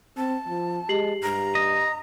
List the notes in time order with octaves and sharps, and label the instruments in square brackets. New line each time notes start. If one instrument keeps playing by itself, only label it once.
[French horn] C4 [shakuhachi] A5
[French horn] F3
[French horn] G#3 [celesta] G4 C7 F#7
[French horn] G2 [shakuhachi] A#5
[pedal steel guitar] D#5